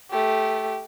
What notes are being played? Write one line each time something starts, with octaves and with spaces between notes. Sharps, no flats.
A3 G4